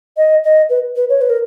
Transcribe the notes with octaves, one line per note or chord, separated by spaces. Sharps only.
D#5
D#5
B4
B4
C#5
B4
A#4